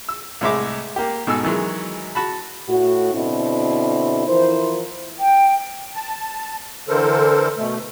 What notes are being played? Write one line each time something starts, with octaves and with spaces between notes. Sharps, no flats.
E6
C2 A2 G#3 C#5 E5 D6
A#3 G4
G#2 B2 A4 G#5 E6
D#3 E3 F#3 G#3
F#4 A5 B5
A2 F#4
B2 D3 C4 E4
E3 F3 E4 A#4 C5
G5
A5
D3 E3 A4 A#4 C5
B2 A3